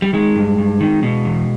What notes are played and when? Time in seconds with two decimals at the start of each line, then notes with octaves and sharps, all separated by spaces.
0.02 G3
0.13 D#3 G#3
0.36 G2
0.58 G2
0.81 D#3
1.03 B2
1.25 E2